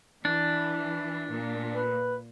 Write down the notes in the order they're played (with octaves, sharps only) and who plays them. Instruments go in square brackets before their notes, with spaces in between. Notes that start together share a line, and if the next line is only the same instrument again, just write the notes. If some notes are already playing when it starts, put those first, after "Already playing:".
[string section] E3 [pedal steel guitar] D4
[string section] A#2
[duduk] B4